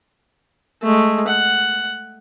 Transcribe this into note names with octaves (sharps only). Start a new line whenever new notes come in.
G#3 A3
F#5